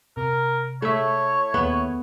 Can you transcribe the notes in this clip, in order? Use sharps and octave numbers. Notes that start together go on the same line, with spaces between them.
C3 A#4
A3 E4 C#5 E5
D#2 A#3 B3